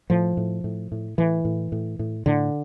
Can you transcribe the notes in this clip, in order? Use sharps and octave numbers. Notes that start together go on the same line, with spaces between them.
A2 F3
A2
A2
A2
A2 E3
A2
A2
A2
A2 D3